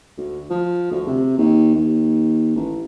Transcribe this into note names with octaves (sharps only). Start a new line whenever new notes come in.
D2
F3
D2
C3
D#2
D#2
A1